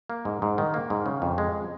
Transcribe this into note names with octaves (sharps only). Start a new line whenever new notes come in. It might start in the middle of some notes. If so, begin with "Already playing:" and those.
A#3
G#2
G#2
D#3
A#3
G#2
C#3
F2
G#3